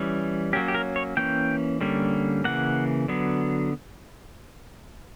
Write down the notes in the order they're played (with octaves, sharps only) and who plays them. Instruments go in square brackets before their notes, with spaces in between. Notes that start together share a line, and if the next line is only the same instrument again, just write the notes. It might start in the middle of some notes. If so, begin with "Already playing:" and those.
Already playing: [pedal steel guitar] E3 G3 C#4
F#3 A#3 C#4 G4
G4
A#4
C#5
E3 A#3 C#4 G5
D3 G3 A#3 C#4
C#3 E3 G3 A#3 F#5
D3 F#3 B3